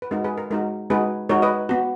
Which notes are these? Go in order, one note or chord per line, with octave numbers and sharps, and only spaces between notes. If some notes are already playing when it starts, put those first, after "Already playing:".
B4
G#3 D#4 F#4 A#4
G#4 B4
A#4
G#3 D#4 F#4 A#4
G#3 D#4 F#4 G#4 B4
G#3 D#4 F#4 A#4 C#5
B4 D#5
B3 F#4